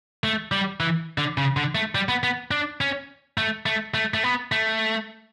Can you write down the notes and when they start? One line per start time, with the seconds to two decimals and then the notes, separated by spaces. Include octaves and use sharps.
0.24 A3
0.52 G3
0.80 E3
1.18 D3
1.38 C#3
1.57 D3
1.75 A3
1.95 G3
2.09 B3
2.24 B3
2.51 D4
2.81 C#4
3.38 A3
3.66 A3
3.94 A3
4.14 A3
4.24 B3
4.52 A3